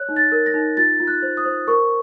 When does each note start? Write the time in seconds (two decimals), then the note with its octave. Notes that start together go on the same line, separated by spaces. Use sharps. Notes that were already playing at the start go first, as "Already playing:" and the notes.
Already playing: C#5 F#6
0.09 D#4
0.16 A6
0.32 A#4
0.46 A#6
0.54 D#4
0.77 F4 A6
1.00 F4
1.07 F#6
1.22 C5
1.37 D#6
1.45 C5
1.67 A#4 C#6